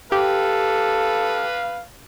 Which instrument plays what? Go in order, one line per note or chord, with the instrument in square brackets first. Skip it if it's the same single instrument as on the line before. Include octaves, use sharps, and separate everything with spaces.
[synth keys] G4 [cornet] A4 [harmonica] B4 F5